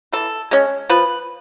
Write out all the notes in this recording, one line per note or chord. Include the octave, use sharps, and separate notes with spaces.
E3 A4
G#3 C#4
F3 B4